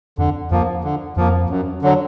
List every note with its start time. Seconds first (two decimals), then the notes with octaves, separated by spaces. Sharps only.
0.18 F2 D3
0.51 F2 F3 A#3
0.84 D3
1.17 F2 F3 A#3
1.50 F#2
1.82 D3 F#3